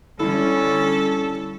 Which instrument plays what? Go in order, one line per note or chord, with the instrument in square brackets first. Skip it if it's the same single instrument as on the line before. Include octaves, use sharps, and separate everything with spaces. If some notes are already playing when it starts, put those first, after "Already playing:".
[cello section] D3 G3 C#4 [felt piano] E4 [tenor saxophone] A4